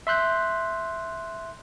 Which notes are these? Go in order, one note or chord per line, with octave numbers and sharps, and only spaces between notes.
E5 C6 F#6 G6